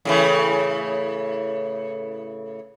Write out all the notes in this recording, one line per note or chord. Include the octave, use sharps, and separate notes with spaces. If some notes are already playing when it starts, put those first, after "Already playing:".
A2 C#3 E3